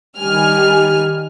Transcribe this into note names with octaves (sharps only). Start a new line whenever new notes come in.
D#3 G3 G#5 F6